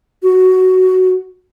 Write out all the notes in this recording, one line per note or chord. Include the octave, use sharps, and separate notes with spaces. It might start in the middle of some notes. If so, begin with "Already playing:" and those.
F#4